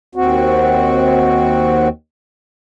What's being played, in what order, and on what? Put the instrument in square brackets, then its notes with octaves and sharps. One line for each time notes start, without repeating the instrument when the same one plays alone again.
[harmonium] D#2 C4 F#4